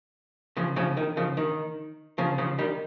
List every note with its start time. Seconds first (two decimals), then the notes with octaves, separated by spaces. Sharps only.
0.57 C#3 F3
0.76 C#3 F3
0.97 D#3
1.17 C#3 F3
1.37 D#3
2.18 C#3 F3
2.38 C#3 F3
2.59 D#3 G3